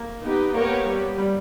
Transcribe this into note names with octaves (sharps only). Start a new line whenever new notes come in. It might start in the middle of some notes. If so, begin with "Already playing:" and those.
Already playing: A#3
B3 D#4 G4
A#3 B3 G4 A#4 C#5
G3 B3 G4
G3